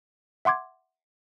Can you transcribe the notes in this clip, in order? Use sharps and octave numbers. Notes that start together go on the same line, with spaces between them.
E5 F#5 C6 D6 G#6